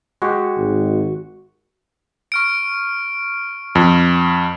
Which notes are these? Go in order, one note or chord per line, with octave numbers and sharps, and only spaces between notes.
G#3 F#4 G4
G#1
C#6 F6 D7
F2